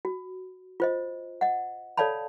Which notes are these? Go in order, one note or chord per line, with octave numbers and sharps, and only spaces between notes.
F#4
F4 C5 D#5
D#5 F#5
A4 C#5 D5 F5 A5 B5